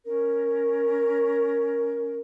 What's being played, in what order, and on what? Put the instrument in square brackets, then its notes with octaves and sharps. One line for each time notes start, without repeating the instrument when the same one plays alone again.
[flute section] C#4 A#4